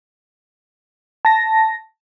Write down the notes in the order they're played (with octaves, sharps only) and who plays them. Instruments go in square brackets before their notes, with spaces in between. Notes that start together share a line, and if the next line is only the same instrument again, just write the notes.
[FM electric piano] A5 A#6